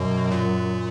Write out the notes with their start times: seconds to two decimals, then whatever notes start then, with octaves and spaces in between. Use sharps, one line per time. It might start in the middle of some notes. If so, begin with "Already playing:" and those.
Already playing: F#2 B2
0.32 A#2